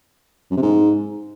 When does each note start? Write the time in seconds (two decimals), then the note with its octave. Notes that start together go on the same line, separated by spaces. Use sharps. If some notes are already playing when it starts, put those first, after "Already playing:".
0.51 F#2
0.57 C3
0.62 G#2